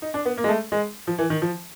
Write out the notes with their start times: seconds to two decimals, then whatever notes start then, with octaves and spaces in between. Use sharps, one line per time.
0.02 D#4
0.14 D4
0.25 B3
0.38 A#3
0.44 G#3
0.49 A3
0.72 G#3
1.07 F3
1.18 E3
1.30 D#3
1.42 F3